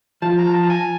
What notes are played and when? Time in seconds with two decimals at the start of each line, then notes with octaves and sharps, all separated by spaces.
0.22 F3 A5
0.38 A#5
0.54 A5
0.70 G#5